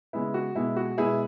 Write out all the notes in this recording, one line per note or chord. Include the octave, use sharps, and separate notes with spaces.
C#3 G#3 B3 E4
F#4
B2 G#3 B3 E4
F#4
B2 G#3 B3 E4 G#4